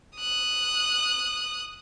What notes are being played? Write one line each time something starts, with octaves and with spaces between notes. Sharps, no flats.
D#6 F#6